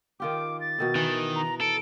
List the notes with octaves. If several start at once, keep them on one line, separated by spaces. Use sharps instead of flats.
D#3 F4 G4 D6
A6
B2 D#3 E4
D#3 E3 B4
A#5
A4 D7